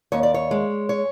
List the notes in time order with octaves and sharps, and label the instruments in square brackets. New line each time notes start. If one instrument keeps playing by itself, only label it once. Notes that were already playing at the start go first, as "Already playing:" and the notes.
[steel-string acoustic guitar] D#2 C#5
D5
C#5
G#3
C#5